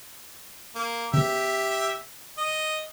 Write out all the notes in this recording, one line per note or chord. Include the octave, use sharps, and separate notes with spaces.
A#3
C#3 B3 G4 E5
D#5